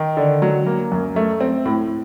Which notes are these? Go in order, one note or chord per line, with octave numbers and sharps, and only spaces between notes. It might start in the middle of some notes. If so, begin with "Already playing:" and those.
Already playing: D#3
D3
F#3
A#3
F#2
A3
C4
A2